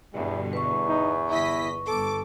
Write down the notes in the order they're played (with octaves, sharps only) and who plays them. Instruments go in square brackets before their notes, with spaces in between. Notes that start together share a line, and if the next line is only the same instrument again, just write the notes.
[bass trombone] E2 [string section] G2 B2 D3 [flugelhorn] G3
[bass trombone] E2 [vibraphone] B4 C#6
[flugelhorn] D#4
[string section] G1 D#5 B6 [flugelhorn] E4
[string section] G1 D6 [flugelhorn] A4